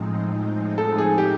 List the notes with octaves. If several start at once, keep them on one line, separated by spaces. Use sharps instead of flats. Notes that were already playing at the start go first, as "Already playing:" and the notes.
Already playing: A2 F3 G#3 C4 D#4
A4
G#4
G4